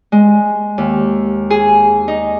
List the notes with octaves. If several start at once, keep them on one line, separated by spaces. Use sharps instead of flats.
G#3
D#2
G#4
D#4